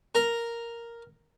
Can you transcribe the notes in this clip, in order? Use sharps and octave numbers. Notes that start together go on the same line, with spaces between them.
A#4 A#5